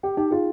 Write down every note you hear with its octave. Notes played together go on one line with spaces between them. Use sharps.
G4 G5
D#4 G4
F4 G#4